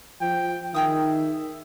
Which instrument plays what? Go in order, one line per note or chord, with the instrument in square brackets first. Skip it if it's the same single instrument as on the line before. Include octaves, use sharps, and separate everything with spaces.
[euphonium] F3 [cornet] G5
[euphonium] D#3 [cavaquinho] G#4 G5 D#6 [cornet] E5